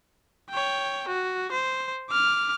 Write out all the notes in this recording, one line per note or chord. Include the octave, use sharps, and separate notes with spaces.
C#5 G5
F#4
C5
D6 F6